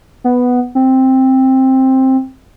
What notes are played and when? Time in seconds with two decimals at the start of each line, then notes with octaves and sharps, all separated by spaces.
0.24 B3
0.75 C4